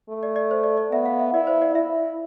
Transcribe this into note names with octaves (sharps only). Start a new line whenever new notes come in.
A3
D5
D5
C5
D5
D5
B3 E5
F5
E5
E4 D5
C5
D5
E4 E5